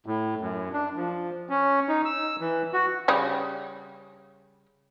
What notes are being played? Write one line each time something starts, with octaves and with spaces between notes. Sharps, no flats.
A2
F#2
D4
F3
C#4
D#4
E6
E3
F#4
C#3 G3